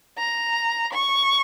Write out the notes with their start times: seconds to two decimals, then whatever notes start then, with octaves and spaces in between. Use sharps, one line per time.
0.18 A#5
0.93 C#6